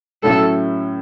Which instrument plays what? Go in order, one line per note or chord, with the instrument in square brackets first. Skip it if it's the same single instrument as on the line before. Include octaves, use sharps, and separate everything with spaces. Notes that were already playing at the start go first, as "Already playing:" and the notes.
[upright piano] A2 F#3 C#4 E4 [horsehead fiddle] A4